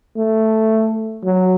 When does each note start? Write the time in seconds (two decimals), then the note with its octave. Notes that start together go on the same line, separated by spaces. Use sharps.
0.17 A3
1.24 F#3